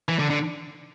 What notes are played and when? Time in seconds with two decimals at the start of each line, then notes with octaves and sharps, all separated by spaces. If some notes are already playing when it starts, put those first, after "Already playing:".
0.09 E3
0.19 D3
0.30 D3